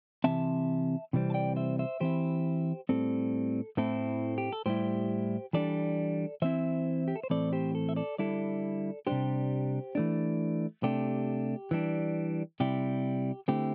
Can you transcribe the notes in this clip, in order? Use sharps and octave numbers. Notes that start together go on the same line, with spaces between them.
C3 E3 C4 E5 A5
C3 E3 G3 C4
A5
D5 G5
C5 E5
C5 E5
E3 C4 E4 G4 C5
A2 G3 C4 A4
A2 A3 C4 E4 A4
G4
A4
A2 G3 E4 G4 C5
E3 G3 D4 A4 D5
E3 C4 E4 C5 E5
G4
A4
C5
A2 E3 C4 A4 D5
G4 C5
A4
E5
A4 D5
D3 G3 E4 A4 D5
C3 G3 D4 G4 C5
E3 A3 D4
C3 A3 D4 G4
E3 G3 D4
C3 G3 E4 G4
D3 A3 C4 E4 G4